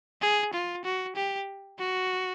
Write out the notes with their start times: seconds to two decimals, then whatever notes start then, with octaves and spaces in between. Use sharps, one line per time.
0.21 G#4
0.53 F4
0.85 F#4
1.16 G4
1.79 F#4